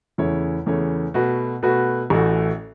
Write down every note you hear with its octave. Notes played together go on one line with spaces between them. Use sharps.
E2 C#3 A3 E4 C#5
E2 C#3 A3 E4 C#5
B2 A3 F#4 B4
B2 A3 F#4 B4
A1 A2 E3 A3 F#4